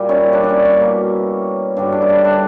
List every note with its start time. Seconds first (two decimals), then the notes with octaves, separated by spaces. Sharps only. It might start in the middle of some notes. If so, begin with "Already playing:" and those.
Already playing: A#2 G3 A#3
0.09 C#4 E4
0.33 D4
0.44 C#4 D4
0.65 C#4
0.81 B2 A#3
1.76 G2 D3 G3 D4
1.92 D4
2.02 E4
2.09 D4
2.25 D4